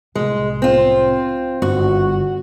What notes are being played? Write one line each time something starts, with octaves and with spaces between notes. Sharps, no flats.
C2 A2 G#3
C4 F4
G1 F#2 F#4